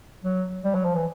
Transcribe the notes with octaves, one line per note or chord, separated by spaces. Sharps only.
F#3
G3
F#3
F3
E3